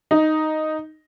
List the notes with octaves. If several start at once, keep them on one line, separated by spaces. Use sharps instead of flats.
D#4